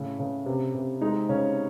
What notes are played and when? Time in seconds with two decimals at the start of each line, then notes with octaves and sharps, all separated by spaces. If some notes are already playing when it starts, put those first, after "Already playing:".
Already playing: A2 C#3
0.19 C#3
0.46 C3
0.75 C3
1.01 G#3 D#4
1.29 C#3 C#4